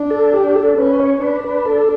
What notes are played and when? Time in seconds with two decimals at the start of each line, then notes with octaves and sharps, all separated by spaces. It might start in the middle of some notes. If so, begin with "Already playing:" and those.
Already playing: D4
0.10 A4
0.33 G4
0.55 A4
0.78 C#4 B4
1.00 C#5
1.22 D4 B4
1.44 B4
1.65 A4